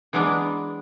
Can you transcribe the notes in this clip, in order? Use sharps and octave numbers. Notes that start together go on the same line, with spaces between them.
E3 F#3 G#3 B3 D4